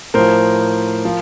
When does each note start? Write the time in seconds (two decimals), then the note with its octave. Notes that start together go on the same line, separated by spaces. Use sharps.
0.14 A2 F3 A#4 C5
1.05 F3